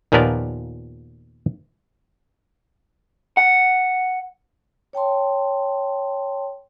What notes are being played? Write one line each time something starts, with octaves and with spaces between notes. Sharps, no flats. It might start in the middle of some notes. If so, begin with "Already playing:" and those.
D#2 A#2 F3 B3 A#4 D5
F#5
C#5 G5 A5 C6